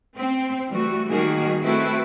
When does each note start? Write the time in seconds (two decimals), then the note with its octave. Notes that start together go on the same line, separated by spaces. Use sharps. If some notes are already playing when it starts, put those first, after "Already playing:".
0.17 C4
0.71 E3 G3 A3 F#4
1.09 D#3 G3 A#3 F#4 G#4
1.63 A3 C4 E4 F#4 A4 B4